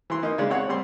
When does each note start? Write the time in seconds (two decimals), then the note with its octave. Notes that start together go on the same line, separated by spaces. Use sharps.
0.10 E3 C6
0.22 A#3 D#4
0.38 C#3 G#3 D4
0.50 C4 C#5 F#5
0.69 G3 C4 C6